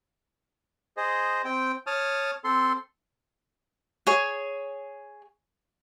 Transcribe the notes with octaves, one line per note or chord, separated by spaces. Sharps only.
G#4 C5 D#5
C4 G5
C#5 A5 D#6 F6
C4 A4 C6
G#4 C#5